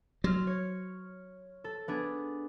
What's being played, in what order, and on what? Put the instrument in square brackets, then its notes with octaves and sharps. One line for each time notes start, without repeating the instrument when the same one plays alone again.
[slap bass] F#3 [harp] C6 F6
[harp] C#5
A4
B3 D4 G#4